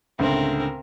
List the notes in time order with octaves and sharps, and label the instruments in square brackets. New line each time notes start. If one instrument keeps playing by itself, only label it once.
[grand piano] C#2 A2 D3 [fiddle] C4 A#4